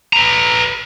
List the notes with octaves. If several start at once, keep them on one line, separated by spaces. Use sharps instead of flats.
B4 A#5